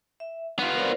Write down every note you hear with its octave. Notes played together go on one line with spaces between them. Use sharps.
E5
B3 D#4 F4
A#4 C5 D5